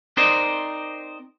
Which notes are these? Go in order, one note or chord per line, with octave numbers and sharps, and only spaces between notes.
C4 D#4 A#4 C5 D5 D#5